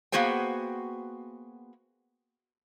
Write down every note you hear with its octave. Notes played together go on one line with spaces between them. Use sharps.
A#3 B3 F#4 G#4 C5 G5